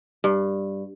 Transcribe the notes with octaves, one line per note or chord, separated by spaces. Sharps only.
G2